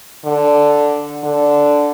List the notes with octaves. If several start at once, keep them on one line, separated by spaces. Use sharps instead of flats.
D3
D3